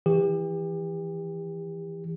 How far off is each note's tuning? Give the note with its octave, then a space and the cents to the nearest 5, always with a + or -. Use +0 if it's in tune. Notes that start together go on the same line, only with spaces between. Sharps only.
E3 +0 G4 +35